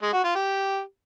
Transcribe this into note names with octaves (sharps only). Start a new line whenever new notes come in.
G#3
F#4
F4
G4